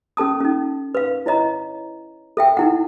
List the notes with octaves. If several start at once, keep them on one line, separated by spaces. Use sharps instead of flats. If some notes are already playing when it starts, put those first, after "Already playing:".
C#4 A4 A5 D#6
C#4 D#4
B4 F5
E4 C#5 D#5 A#5
A4 E5 G5
D#4 E4 F#5